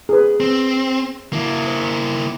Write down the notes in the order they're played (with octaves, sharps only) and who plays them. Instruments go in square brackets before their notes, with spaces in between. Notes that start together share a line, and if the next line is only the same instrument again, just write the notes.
[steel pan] G#4 B4
[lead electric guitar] C4
A#3 E4
[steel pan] C5